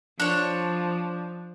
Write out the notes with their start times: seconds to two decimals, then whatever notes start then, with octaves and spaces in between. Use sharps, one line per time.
0.20 F3 D4 C#5